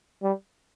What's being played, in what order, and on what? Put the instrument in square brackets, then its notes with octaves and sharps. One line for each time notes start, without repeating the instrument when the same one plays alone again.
[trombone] G3